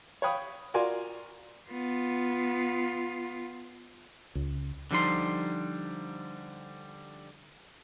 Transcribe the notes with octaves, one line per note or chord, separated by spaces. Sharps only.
C#5 F5 G5 B5 D#6
F4 F#4 A#4 D5 G#5 C6
B3 F4
C#2
D3 F3 G3 D#4 C6